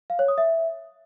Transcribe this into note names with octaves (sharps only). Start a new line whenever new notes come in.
F5
C#5
D#6
E5